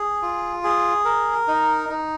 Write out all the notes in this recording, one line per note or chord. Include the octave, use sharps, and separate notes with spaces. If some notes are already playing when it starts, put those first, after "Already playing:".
Already playing: G#4
F4
G#4
A#4
D#4
D#4